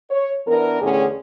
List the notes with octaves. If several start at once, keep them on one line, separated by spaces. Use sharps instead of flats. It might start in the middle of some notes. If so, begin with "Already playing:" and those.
C#5
E3 B3 D4 A#4
E2 A2 D3 C#4 G4 G#4